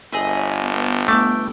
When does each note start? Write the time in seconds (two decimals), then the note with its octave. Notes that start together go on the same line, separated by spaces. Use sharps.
0.12 G1 G#4 C#5 D#5 E5
0.59 B3 G5
1.08 A3 D6